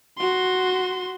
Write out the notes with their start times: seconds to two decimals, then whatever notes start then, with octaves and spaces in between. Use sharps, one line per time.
0.18 F#4 C6